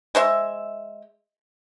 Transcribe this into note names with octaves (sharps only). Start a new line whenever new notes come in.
G#3 C5 E5